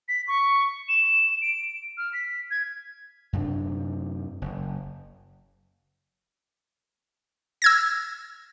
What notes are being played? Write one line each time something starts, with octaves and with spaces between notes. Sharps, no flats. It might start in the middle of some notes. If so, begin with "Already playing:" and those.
B6
C#6
E7
D7
F6
B6
G#6
F#2 C3 D4
F#1
E6 G#6 A#6